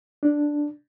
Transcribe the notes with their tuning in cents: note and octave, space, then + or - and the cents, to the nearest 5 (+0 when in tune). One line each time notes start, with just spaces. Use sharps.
D4 +0